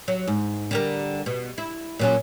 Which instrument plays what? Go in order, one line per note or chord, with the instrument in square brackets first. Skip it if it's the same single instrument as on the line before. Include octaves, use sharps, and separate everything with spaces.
[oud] F#3
G#2
D3 G3 A#4
B2
E4
A#2 F#3 C#4